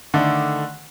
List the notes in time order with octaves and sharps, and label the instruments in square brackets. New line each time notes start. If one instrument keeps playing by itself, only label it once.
[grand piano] D3 D#3 A3 D4